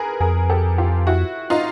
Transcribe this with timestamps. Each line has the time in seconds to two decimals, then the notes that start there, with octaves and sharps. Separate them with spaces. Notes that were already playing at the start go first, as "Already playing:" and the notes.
Already playing: G#4 A#4 B4
0.20 F2 G#4 A#4
0.50 G4 A4
0.78 F4 G4
1.07 E4 F#4
1.50 D#4 F4